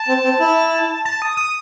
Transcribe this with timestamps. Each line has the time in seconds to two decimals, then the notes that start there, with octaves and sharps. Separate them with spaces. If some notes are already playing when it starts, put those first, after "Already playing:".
Already playing: A5
0.08 C4
0.24 C4
0.40 E4
1.05 A5
1.22 D#6
1.37 D#6